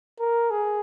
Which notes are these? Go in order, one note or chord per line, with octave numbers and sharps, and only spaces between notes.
A#4
G#4